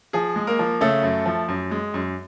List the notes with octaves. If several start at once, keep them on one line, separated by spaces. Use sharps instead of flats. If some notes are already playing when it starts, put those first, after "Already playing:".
F3 G#4
G#3
A#3 A#4
F3
C#3 A3 A4
F#2
F3
F#2
G#3
F#2